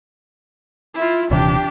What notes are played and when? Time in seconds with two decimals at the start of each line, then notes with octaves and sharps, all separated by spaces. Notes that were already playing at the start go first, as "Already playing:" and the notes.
0.94 E4 F4
1.31 D#1 C3 E3 D4 G4